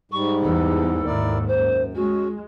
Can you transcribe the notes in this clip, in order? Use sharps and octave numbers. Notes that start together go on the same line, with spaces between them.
G#2 G3 C#6
E2 A4
D#2 G#2 E4 A#4 D5
F#2 C5
G#3 C#4 F#4